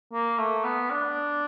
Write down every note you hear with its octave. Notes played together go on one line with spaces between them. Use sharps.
A#3
A3
B3
D4